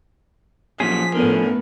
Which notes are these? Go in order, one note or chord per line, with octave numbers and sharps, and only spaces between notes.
F#2 A#2 F3 C#4 G#4 B6
A2 D3 B3 C#4 A#4